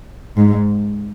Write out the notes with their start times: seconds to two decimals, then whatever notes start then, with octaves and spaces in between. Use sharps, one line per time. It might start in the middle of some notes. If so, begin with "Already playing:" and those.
0.37 G#2